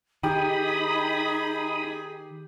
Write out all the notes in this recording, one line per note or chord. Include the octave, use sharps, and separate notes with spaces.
D#3 D#4 G4 G#4 B5 D#6